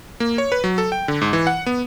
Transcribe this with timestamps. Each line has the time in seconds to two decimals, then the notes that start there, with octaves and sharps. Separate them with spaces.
0.20 A#3
0.38 C#5
0.52 B4
0.64 F#3
0.78 A4
0.92 G5
1.08 D3
1.21 G#2
1.33 E3
1.47 F#5
1.66 B3